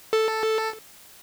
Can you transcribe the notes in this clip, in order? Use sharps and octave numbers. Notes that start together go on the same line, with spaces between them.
A4